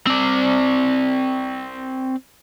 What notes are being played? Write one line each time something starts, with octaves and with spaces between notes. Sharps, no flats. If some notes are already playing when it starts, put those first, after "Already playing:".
C4 D5